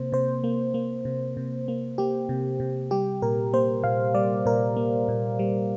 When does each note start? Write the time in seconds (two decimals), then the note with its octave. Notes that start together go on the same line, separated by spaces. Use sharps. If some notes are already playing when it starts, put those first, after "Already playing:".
Already playing: C3 A#3 C5
0.12 C3 C5
0.44 A#3
0.74 A#3
1.05 C3
1.37 C3
1.68 A#3
1.98 A#3 G4
2.29 C3
2.60 C3
2.91 G3 G4
3.22 A#2 A#4
3.53 A#3 C5
3.84 A#2 F5
4.14 G3 D5
4.46 A#2 A#4
4.76 A#3
5.08 A#2
5.39 G3